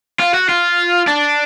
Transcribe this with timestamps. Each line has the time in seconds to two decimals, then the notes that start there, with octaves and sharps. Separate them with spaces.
0.20 F4
0.34 F#4
0.49 F4
1.07 D4